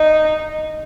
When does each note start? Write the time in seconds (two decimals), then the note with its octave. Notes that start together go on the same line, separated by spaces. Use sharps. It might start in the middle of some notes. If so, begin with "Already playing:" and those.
Already playing: D#4